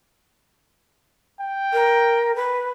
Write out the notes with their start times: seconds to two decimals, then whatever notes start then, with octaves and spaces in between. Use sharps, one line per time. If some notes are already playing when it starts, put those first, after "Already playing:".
1.41 G5
1.73 A#4
2.35 B4